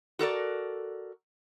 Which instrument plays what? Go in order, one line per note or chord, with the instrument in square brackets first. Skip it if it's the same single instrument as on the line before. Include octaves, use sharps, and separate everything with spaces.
[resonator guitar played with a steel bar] F#4 A4 A#4 D5